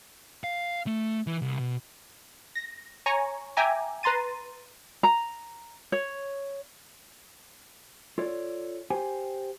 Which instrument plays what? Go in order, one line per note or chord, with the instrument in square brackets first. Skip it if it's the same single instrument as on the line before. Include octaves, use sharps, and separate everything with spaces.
[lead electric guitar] F5
A3
E3
C2
B2
[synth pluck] A#6
C#5 G#5 A#5 C#6
E5 G5 G#5 A#5 D6
B4 A#5 C6 A6 D#7
[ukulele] A#5
C#5
[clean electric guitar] F4 A4 C#5 D5
G4 C5 G5 G#5